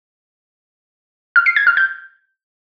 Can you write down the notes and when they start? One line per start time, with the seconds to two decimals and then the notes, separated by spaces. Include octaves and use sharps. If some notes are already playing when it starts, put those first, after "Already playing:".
1.36 F6
1.46 C7
1.56 G#6
1.67 F6
1.77 G6